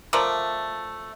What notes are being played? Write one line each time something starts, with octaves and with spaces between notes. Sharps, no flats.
F3 A3 A#4 D5